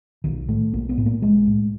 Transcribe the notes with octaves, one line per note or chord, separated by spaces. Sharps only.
B1 D#3
A2 A3
B1 A#3
B3
A2
A#3
B1 G#3
A2